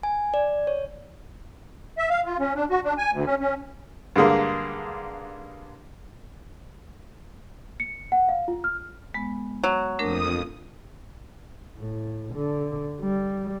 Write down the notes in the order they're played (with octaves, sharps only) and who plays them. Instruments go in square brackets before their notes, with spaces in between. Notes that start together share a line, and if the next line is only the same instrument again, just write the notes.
[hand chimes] G#5
D5
C#5
[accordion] E5
F5
F4
C#4
D4
F#4
D4
G#5
D2
C#4
C#4
[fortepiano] G2 D3 G#3 A#3
[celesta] C#7
F#5
F5
F4
F6
[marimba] G#3 B3
[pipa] F#3
[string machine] F2 D#6 [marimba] A3 D4 A#4
[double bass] A2
D3
G3